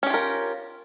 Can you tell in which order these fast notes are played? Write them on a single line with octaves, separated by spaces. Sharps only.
C#4 G4 F4 A#4